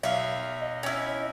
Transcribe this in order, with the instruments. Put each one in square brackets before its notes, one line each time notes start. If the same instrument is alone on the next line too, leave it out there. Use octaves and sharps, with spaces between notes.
[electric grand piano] B1 [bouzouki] E5 F5
[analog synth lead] D#5
[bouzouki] C#4 E4